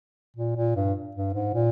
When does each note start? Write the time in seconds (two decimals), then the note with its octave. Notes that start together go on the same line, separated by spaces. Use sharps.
0.36 A#2
0.56 A#2
0.75 G2
1.15 G2
1.34 G#2
1.54 A#2